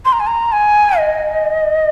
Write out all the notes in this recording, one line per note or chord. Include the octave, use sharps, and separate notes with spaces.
C6
A#5
G#5
A#5
G#5
D#5